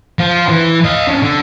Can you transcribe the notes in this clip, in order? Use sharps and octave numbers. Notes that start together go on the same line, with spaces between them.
F3
E3
D#5 F5
C#4 D4
D3